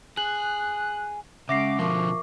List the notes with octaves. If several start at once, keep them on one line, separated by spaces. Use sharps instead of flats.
G#4 F#6 F#7
C#3 G#3 C#4 E5 F#5 D6 A#6 C7
B2 D3 F3 A#4 C#6 D6